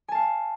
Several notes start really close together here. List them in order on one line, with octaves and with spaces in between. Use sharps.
G#5 A5 F5